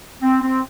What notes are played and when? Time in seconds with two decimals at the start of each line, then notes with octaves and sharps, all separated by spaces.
0.22 C4
0.42 C4